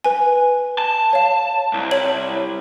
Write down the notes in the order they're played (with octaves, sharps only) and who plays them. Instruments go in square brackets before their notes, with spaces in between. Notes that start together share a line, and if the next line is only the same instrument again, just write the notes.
[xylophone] B4 G#5
[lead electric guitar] A5
[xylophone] C#5 F5
[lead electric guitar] C2
[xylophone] C#5 F#7